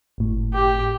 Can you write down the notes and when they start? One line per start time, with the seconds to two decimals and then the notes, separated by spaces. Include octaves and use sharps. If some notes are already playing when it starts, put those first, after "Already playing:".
0.18 G1 A2
0.53 G4